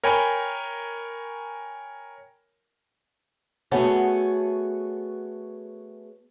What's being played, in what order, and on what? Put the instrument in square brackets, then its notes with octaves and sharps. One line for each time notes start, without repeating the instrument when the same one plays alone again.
[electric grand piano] A#4 C#5 G5 G#5 B5
[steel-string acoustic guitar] A3 B3 F#4 G#4 A4 C#5